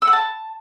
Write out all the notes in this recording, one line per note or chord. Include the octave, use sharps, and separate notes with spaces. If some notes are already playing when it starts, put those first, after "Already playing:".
E6
F#5
A5